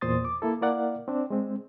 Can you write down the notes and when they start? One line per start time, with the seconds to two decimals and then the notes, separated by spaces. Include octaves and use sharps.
0.01 E2 A#2 C5 C6 D#6 A6
0.25 D6
0.42 A#3 E4 A4
0.61 A#3 E4 A#4 D5 F5 F#5
1.08 C4 D4
1.30 G#3 C4